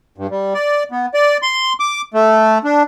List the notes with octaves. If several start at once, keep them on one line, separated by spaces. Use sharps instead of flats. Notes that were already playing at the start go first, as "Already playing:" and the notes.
G2
G3
D5
B3
D5
C6
D6
A3
D4